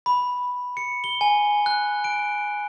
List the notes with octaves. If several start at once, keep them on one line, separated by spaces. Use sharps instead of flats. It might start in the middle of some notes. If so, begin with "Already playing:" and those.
B5
C#7
G7
G#5
F#6
D7